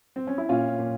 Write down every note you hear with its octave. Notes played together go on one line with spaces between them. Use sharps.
C4
C#4
E4
A#2 C#4 F4
A#2